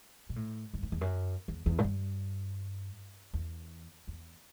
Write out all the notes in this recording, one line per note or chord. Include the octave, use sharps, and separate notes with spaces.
B2
A2
G2
F#2
E2
F#2
E2
E2
A2
G2
E2
E2